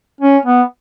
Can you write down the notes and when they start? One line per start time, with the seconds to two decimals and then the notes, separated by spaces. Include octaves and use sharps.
0.21 C#4
0.46 B3